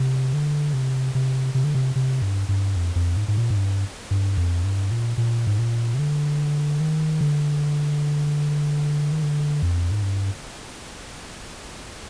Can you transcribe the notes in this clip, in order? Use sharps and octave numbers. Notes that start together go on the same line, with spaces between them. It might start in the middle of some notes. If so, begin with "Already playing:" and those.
Already playing: C3
D3
C3
C3
C3
D3
C3
C3
G2
G2
F2
F2
G#2
G#2
A#2
G#2
G2
G2
F2
G2
A#2
A#2
G#2
A#2
C3
D3
D#3
D3
D#3
D3
F2
G#2
G2